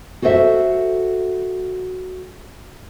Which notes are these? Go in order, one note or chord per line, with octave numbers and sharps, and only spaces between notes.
F#4 A4 C5 D#5 E5